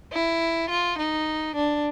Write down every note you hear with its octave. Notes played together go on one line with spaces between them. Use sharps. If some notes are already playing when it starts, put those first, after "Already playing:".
E4
F4
D#4
D4